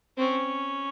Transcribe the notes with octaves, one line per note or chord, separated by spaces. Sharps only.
C4 C#4